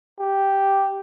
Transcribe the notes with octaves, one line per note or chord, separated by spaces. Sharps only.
G4